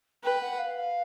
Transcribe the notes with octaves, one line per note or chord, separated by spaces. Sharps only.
B4 G5
F#5
F5
F5